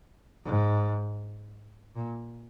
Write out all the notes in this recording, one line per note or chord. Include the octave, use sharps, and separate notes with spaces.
G#2
A#2